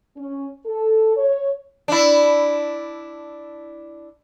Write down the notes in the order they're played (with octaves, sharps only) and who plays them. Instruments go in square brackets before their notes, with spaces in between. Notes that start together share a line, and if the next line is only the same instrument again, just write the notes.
[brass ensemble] C#4
A4
C#5
[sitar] D4 E4